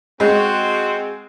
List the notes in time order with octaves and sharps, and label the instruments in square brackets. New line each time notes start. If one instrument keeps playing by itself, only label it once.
[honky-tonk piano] G#3 [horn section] C4 F#4